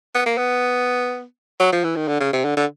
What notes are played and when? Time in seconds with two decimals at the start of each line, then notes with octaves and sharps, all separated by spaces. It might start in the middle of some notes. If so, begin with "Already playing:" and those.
0.15 B3
0.26 A#3
0.38 B3
1.60 F#3
1.72 F3
1.84 E3
1.96 D#3
2.08 D3
2.20 C#3
2.33 C3
2.45 D3
2.57 D3